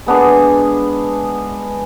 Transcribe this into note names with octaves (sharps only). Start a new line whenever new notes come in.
G#3 B3 D4 G#4